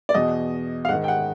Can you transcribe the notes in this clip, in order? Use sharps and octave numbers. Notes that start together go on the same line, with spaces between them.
D5
E2 B2 D#5
F5
G#2 D#3 F#5
G5
F#5